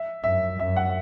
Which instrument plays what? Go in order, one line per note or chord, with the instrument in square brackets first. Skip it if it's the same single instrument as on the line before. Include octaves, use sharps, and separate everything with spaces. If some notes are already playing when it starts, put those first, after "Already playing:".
Already playing: [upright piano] E5
[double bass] F#2 [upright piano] E5
[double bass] F#2 [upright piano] E5
[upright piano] F#5